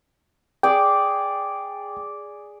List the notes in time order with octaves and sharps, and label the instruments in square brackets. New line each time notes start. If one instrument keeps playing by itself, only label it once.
[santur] G#4 D5 [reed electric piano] G5